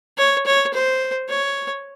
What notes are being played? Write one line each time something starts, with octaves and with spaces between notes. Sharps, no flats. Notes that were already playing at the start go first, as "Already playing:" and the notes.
C#5
C#5
C5
C#5